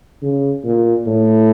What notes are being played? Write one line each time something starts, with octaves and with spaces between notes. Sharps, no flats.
C#3
A#2
A2